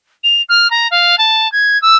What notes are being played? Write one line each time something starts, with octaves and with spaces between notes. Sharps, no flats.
F7
F6
A#5
F5
A5
G#6
E6